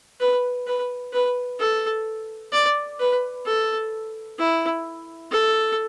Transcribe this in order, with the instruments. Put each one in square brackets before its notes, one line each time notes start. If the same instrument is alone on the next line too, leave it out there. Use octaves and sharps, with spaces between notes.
[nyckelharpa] B4
B4
B4
A4
D5
B4
A4
E4
A4